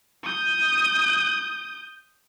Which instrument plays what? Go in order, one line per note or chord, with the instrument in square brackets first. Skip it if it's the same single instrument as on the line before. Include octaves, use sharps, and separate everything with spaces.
[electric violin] D#6 G6